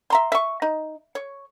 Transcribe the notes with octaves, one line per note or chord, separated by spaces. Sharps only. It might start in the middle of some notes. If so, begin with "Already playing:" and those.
E5 A#5 C6
E5 C#6
D#4
C#5